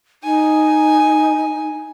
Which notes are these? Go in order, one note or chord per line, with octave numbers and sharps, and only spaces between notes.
D#4 G#5